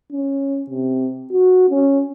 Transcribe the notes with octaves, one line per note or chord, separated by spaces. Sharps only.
C#4
C3
F#4
C#4